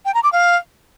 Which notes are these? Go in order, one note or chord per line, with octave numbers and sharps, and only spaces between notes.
G5
A#5
D6
F5